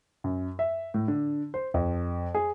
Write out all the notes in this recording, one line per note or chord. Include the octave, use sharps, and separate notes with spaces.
F#2
E5
A2
D3
C5
F2
G#4